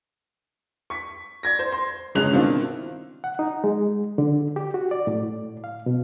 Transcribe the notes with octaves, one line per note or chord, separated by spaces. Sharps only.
C#6 B6
D5 G#6 A#6
C5
C6
G1 C#3 G#3 C#4 F#6 F7
B2 D#3 C4 D4 E4 F4
F#5
D#4
G#3
D3
G4
F#4
D5
A2
F5
B2